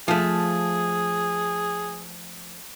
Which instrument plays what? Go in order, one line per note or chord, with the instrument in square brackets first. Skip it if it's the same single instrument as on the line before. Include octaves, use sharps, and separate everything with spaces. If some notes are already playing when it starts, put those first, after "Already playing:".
[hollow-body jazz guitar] F3 A3 [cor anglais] G#4